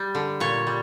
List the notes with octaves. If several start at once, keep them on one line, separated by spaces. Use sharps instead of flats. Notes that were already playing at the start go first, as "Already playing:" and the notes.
Already playing: G3
D3
A#2 C#5
G3